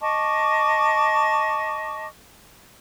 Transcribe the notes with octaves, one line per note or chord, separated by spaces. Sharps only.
D#5 A5 C#6 D6